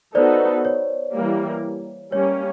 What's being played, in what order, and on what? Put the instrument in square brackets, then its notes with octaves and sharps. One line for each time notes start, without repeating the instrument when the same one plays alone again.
[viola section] B3 D#4 F#4 A4 [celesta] C5 D5
[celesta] C#5
[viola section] E3 G3 A#3
[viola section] G3 A#3 C#4 [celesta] C#5